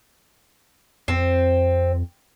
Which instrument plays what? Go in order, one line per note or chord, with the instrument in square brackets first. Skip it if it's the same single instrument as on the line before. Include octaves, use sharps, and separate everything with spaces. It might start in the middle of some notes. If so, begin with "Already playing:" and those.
[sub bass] F2 [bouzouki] C4